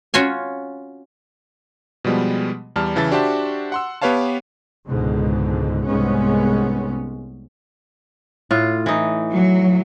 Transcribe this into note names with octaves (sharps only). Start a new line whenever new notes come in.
C#4 F4 F#4 G#5
B2 F3 G3 G#3 B3
E2 G3 A5 F6
C#3 E3 E5 A5 A6
D4 F#4 G4 C5 E5 A5
F#5 C6 E6
B3 G4 B4 C#5 F5 A5
C#2 G#2 B2 D3
C2 G#2 G#3 B3 C#4
A2 F4
E3 D#4
F#3